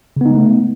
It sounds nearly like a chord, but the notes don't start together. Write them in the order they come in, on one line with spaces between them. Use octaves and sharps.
C#3 B3 D#4 G#3 A3